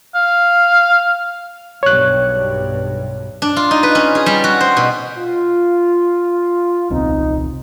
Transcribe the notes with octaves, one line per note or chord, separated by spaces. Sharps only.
F5
B1 G2 C#5 F#6
D4
F4
D#4
B4
C#4
G#4
G3
F#4
C5
B2
F4
D#1 C2 C4 D#4